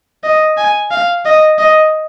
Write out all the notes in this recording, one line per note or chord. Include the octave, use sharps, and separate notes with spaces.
D#5
G#5
F5
D#5
D#5